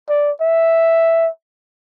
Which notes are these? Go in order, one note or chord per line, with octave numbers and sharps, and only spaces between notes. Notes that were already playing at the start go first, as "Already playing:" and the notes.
D5
E5